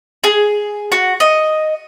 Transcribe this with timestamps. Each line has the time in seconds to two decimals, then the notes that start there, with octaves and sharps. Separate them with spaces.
0.24 G#4
0.92 F#4
1.20 D#5